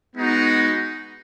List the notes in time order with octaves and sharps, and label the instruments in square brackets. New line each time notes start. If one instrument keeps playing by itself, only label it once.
[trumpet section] G#3 B3 D#4 F#4